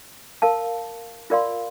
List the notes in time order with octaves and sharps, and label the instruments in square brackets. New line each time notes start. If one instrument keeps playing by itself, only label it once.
[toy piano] A#4 F5 A5
F4 A#4 D5 F5 C6